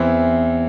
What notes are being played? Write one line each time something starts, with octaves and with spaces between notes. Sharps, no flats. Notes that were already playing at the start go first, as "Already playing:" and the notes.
Already playing: E2 E3 C4 E4